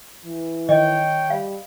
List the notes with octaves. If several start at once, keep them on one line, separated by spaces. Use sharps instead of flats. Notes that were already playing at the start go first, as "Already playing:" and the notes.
E3
D#3 C#5 D#5 G5
G3 F5